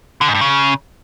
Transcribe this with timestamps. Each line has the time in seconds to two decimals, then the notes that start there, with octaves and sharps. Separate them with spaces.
0.21 D3
0.28 G#2
0.34 G2
0.41 C#3